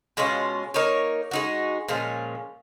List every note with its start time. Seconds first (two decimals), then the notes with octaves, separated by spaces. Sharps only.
0.17 B2 G#3 C#4 F4
0.74 A#3 D#4 A#4 C#5
1.31 G#3 D#4 F#4
1.88 A#2 F3 G#3 C#4